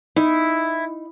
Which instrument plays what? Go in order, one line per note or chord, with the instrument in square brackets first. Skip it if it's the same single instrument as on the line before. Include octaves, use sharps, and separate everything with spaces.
[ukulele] D#4 [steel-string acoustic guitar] E4